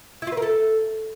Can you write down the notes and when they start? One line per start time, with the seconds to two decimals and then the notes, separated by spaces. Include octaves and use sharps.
0.22 E4
0.27 F4
0.32 B4
0.37 A#4
0.42 A4